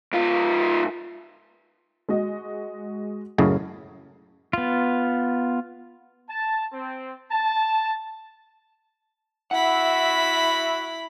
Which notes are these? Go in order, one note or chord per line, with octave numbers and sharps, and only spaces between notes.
G#2 F4
G#3 F#4 D#5
F#1 F#2 A2 C#3
B3 F4
A5
C4
A5
E4 F#4 E5 F#5 B5